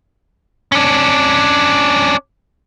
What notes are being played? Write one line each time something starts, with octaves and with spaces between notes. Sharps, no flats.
C#4 D4